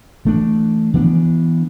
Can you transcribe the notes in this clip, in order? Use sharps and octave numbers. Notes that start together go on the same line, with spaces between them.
E3 A3 D4
E3 B3 D4